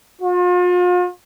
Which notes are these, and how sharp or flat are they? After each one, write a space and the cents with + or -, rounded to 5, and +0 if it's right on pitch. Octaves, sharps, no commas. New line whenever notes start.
F4 +40